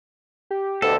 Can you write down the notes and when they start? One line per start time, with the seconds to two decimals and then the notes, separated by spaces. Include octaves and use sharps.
0.51 G4
0.82 D2 B2 D3 A4